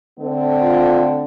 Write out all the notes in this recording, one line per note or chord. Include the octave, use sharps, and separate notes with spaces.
D3 A3 C4
F4